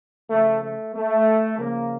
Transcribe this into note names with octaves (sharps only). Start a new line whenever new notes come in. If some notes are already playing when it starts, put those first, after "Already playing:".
C#3 F3 A3
A3
A3
C#3 F3 A#3